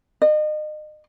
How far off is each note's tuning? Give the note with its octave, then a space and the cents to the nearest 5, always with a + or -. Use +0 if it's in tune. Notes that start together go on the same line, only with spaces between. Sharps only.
D#5 -35